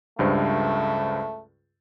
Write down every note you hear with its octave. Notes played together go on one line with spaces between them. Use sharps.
C#2 G2 A3 C5